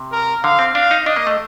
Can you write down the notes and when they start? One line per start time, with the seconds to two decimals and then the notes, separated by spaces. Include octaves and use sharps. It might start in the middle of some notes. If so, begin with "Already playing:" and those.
Already playing: C3
0.12 A#4
0.43 D3 F5
0.59 C4
0.75 D4 F5
0.91 D#4
1.06 D4 D#5
1.17 A#3
1.27 A3